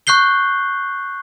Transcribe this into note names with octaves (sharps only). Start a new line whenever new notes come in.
C#6 F#6 G6 C7 G7